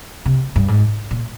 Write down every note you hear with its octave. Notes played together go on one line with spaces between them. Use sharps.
C3
G2
G#2
A#2